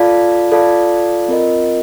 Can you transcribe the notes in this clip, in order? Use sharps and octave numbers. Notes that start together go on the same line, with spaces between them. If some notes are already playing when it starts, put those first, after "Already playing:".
Already playing: F4 A4 D5 F5 A5
F4 A4 D5 F5 A5
C4 F4 A#4 D#5